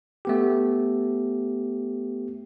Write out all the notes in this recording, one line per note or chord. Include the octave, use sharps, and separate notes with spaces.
A3 B3 G4